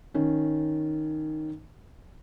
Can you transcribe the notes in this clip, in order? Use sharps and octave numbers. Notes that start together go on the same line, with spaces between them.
D#3 C#4